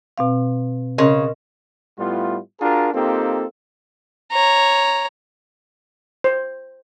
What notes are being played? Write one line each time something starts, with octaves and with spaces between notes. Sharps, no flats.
B2 C4 F5
C#3 A#4 D#5 C6
A2 G3 B3 E4 F4
D4 F4 F#4 G#4 A#4
A#3 C4 D#4 F4 G4 A4
C#5 A#5
C5